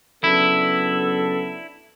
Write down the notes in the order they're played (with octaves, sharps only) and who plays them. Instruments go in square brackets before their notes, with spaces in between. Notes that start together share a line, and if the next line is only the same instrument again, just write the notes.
[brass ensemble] C#3 F#3 B3 D4 A4 [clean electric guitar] E4